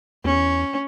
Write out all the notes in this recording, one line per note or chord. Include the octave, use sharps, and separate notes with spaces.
E2 C#4